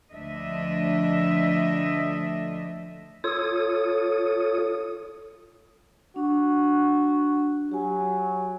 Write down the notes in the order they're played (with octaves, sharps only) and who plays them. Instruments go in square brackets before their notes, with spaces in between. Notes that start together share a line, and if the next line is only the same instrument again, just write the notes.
[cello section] D2 F3 A3 D4 D#5 E5
[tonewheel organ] F4 A4 C#5 D#6
[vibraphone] D4 [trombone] F#4
[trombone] F#3 [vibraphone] G4 G#5